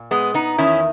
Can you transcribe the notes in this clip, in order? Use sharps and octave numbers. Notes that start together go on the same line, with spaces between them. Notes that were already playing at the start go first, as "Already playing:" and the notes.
Already playing: A#2
G#3 B3
B3 D#4
E2 D#3 C#4 E4